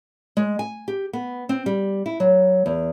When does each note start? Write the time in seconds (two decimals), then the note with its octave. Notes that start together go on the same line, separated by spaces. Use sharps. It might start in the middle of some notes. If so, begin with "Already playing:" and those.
0.37 G#3
0.59 G#5
0.88 G4
1.13 B3
1.49 C4
1.66 G3
2.06 E4
2.20 F#3
2.66 E2